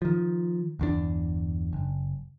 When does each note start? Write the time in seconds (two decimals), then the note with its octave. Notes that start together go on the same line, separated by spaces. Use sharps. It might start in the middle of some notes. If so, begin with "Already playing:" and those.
0.02 D#3 F3
0.79 G1 E2 C#3 D4
1.73 F#1